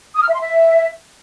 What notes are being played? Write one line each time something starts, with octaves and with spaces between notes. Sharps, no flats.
D#6
F6
E5
C6
E5